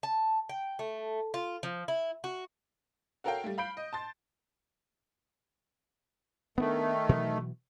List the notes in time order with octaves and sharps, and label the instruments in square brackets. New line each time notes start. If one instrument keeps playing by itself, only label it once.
[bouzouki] A5
G5
A3
F4
F3
E4
F#4
[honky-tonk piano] F#4 A4 A#4 C#5 F5 G5
G3 A3
F5 B5 G6 D7
D#5
A5 C6 A6
[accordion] D#3 A3 [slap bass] B3 C#4 D4
[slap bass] B2 E3 F#3